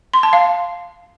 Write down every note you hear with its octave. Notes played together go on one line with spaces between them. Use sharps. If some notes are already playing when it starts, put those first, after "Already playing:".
C6
A5
F5